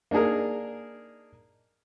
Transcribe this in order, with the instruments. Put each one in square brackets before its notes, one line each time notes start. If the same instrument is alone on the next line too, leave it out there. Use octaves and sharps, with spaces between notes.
[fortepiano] A#3 D4 D#4 G#4 A#4